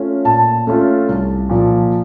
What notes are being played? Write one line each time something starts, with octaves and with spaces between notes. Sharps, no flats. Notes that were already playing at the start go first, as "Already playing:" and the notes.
Already playing: A3 C#4 F4
A#2 A5
A3 C#4 F4
C2
A#2 F3